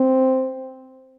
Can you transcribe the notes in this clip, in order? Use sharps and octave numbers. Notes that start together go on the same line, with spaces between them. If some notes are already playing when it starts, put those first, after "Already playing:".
Already playing: C4